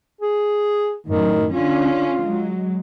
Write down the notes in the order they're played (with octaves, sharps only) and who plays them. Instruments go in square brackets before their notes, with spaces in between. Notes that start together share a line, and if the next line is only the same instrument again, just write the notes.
[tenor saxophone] G#4
[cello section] F#2 A2 [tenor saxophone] D#3
[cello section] D3 C#4 [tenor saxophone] F4
[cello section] F#3 G#3